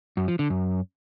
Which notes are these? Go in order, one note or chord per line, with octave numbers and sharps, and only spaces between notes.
F#2
F3
D3
F#2